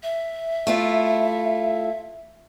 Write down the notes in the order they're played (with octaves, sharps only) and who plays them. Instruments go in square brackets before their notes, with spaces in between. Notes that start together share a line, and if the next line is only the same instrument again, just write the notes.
[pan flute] E5
[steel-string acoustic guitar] A3 E4 F4